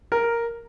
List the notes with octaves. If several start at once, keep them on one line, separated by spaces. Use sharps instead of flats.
A#4